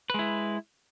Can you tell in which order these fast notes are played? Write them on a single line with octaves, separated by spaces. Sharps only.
B4 G#3 E4